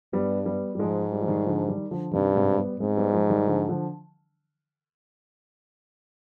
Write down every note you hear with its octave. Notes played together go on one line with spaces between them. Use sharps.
G2 G3 B3
G3 B3
G3
G#2 F3 G#3
G3
F3
D#3 G3
D3 F3
D#3 G3
D3 F3
G2 C3 D#3
G#2 C3
G3 B3
G#2 G#3 C4
G3 B3
F3 G#3
D#3 G3
D3 F3
D3 F3